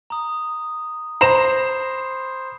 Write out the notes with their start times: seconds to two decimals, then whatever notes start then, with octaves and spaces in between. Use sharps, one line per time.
0.10 A#5 D#6
1.21 C5 A#5 B5 C7 E7